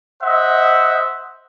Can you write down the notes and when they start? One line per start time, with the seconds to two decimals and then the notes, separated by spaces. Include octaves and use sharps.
0.22 C5 D#5 E5 F#5